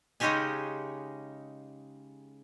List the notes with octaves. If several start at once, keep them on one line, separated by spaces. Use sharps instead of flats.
C#3 G#3 C#4 D#4 G4 G#5